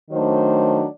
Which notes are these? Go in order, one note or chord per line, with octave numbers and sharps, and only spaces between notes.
D#3 F#3 A3 D4 C5